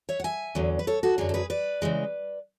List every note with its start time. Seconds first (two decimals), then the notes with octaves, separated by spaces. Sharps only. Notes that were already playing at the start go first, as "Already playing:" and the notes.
0.09 C#5 E5
0.20 F#5
0.24 E5 G#5
0.55 E2 D3 F#3
0.79 B4
0.87 A4 C#5
1.03 F#4 A4
1.18 F#2 D3 F#3 G#4
1.29 A4
1.34 G#4 B4
1.50 B4 D5
1.82 C#3 E3 G#3